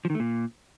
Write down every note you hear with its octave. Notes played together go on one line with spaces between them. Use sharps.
F3
D#3
A3
A#2